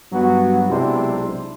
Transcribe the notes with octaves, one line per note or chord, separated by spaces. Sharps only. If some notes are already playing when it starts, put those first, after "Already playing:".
G2 F#3 B3 F#4
B1 C3 G#3 D4 E4 C5